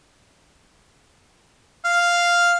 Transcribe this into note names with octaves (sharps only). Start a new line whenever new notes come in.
F5